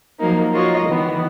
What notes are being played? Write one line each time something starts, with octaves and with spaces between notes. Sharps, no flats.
F3 F#3 A#3 D#4
F4 F#4 A#4 C#5 D#5
D#3 E3 B3